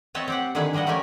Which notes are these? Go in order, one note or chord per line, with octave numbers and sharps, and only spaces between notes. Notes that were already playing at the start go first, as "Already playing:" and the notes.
C4 B4 C#5 D#5 E5 A5
C4 G4 F#5
D3 D#3 G#3 E4 G#4 B4
F3 G3 G#3 D#5 F#5
D3 A3 C#4 G4 A#4 G#5